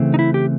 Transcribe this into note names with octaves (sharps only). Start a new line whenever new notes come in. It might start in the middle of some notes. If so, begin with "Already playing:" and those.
Already playing: C#3 E3 A3 C4
D#4
E4
G4